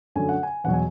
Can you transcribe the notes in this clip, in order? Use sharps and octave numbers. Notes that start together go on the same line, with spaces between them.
F#2 D3 F#3 A3 G#5
F#5
G#5
E2 B2 F#3 F#5
G#5